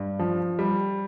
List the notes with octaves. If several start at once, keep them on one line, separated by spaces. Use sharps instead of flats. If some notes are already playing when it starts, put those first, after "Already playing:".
Already playing: G2
F3
G3